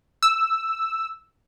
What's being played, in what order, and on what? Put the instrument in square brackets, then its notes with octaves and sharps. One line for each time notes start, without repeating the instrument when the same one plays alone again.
[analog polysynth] E6